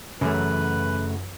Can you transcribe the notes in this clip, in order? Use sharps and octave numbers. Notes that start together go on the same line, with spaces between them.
F#2 C#3 E3 A3 B4